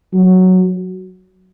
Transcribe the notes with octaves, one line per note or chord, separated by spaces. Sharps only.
F#3